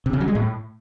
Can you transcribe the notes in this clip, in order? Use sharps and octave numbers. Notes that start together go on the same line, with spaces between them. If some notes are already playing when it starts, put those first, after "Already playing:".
C3
C#3
F#3
G#3
A2